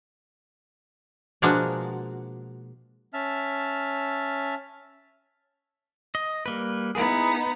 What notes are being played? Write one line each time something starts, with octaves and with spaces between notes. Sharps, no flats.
B2 F3 G#3 A#3 D4 F#4
C#4 E5 A5 F6
D#5
G3 A#3 B4
B3 D#4 E4 G#4